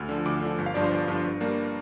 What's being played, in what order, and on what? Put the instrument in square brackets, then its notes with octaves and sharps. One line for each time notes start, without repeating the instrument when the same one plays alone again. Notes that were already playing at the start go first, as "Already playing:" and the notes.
Already playing: [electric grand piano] D2 F6
D3 F3
D2 D6
D3 F3
G1
F5
G2 F3 D4 D5
C5
G1 D5
G2 F3 D4
G2
G3 A#3 D4